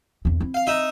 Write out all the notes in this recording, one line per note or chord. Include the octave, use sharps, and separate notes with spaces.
E2 C4
C4 E4
F5
D#4 E5